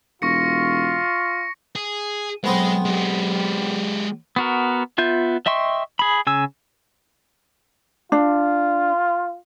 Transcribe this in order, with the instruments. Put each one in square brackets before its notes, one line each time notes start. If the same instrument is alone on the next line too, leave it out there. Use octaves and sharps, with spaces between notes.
[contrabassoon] E1 [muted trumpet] F4 [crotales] C#6 A#6 C#7
[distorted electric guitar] G#4
[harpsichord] B1 B3 C4 [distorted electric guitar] G#3
[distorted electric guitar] G#3 G4
[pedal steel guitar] B3 F#4 A#4
B3 F4 E5 G6
D#5 E5 G5 C6 C#6
G#4 B5
C#3 G#5 E6
[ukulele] D4 [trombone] F4